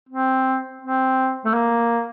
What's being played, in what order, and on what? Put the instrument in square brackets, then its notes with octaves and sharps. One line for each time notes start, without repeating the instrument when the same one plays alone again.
[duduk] C4
C4
A3
A#3